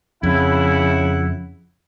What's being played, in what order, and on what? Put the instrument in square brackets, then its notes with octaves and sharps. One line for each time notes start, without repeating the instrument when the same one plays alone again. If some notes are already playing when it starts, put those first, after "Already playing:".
[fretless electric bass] F2 [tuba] C#3 [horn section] E4 F#5